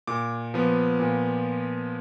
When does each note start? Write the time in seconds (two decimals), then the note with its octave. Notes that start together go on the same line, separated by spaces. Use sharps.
0.07 A#2 D6
0.54 F3 B3
1.00 A#2